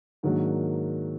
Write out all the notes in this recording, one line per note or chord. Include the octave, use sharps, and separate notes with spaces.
G#2 D#3 F#3 A#3 D4